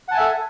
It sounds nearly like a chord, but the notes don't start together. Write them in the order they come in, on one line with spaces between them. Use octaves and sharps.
F#5 A5 G#5 E5 A4